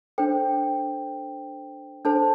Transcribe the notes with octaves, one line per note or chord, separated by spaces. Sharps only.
D4 A4 C5 G5
D4 A4 C5 A5